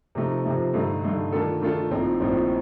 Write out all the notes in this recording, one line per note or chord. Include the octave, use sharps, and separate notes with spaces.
C3 F3 A3 D#4
C3 F3 A3 D#4
G2 D3 A3 D#4
G2 D3 A3 D#4
D#3 A3 D4 F4 A4
D#3 A3 D4 F4 A4
A#1 A2 F3 C4 D#4
A#1 A2 F3 C4 D#4